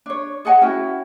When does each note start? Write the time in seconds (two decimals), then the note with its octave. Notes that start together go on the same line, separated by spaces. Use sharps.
0.06 D4 C#5
0.45 G#4 D#5 F#5 G#5
0.61 C#4 E4 F#4 G5